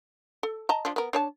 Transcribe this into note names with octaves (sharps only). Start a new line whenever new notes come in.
A4
D#5 A5 A#5
F3 D4 F4
B3 A#4
D4 C#5 A5